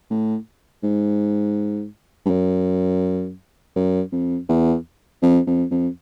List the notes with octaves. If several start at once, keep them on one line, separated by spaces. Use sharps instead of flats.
A2
G#2
G2
F#2
F#2
F2
E2
F2
F2
F2